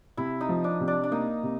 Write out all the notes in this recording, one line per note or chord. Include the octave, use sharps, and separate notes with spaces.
C3 E4
D#4
F3
D4
C3
D4
D4
A#3 D#4
C3